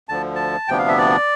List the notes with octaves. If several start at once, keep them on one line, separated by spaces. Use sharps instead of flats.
D2 D3 F3 A5
A5
D2 C3 F3 B3 D4 G5
F5
E5
D5